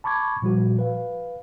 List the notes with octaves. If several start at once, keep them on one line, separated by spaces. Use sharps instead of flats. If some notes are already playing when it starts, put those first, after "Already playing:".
A5 B5 C#6 D6 G#6
A#2 F3 G3 F#4
B4 F5